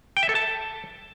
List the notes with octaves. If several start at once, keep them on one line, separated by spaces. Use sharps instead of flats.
G5
E5
A4
A5